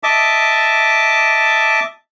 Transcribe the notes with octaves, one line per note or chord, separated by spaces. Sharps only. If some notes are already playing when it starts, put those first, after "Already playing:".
D#5 E5 A5 D6